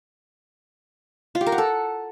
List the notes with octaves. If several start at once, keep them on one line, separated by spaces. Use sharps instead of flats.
F4
G4
A#4
F#5
A4